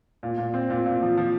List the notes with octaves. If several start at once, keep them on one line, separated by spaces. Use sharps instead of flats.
A#2
A#2
C4
A#2
A#2
F3
F3